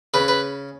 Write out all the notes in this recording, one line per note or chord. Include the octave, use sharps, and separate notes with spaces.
C#3 B4
B4